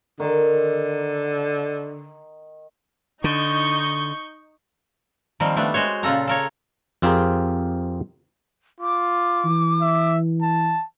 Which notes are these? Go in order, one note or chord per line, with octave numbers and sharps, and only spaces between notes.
D3 D#3 A#5
D3 D#4 C#6 G6
D#3 F3 G3 A#3 C4
G3 A3 B3 D4
G#3 F#4 C5 C#5
A#2 C#3 F4 A4 A#5
A4 A#4 C#5
F2 C4 F4 G4 G#4 A#4
F4 D6
E3
E5
A5